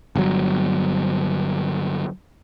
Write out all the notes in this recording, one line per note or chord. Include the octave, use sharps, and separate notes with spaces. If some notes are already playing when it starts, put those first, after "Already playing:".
G1 F#3